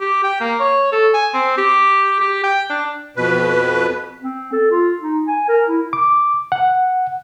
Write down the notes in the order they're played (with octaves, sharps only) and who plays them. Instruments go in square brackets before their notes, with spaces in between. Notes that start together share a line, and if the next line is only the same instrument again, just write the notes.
[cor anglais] G4
G5
A#3
C#5
A4
G#5
C4
G4
G4
G5
D4
[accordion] F2 B2 B4
[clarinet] C4
A4
F4
D#4
G#5
A#4
E4
[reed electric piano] D6
F#5